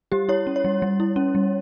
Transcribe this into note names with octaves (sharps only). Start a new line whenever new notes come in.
G3 G4
E4 C#5
C#4
C#5
G3
G3
E4
C#4
G3